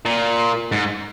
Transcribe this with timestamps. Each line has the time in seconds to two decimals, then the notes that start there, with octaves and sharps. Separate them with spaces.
0.06 A#2
0.72 G#2